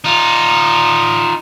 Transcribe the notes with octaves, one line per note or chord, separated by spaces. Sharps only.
D#4 F4